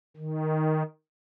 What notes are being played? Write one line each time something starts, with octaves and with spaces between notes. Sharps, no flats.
D#3